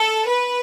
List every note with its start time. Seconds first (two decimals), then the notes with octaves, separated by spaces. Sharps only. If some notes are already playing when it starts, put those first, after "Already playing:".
Already playing: A4
0.29 B4